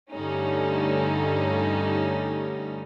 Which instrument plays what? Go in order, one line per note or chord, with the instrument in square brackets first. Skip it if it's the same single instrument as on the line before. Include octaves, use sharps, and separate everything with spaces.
[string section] G2 D3 G3 A3 C#4 D#4